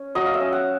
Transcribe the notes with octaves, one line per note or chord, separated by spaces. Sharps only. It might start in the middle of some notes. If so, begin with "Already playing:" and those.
Already playing: C#4
F#3 D#5
F5
E5
C#4
F#5